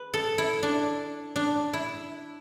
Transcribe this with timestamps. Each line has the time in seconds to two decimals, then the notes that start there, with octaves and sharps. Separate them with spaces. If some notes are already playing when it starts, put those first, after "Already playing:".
Already playing: B4
0.14 A4
0.38 E4
0.63 D4
1.36 D4
1.73 E4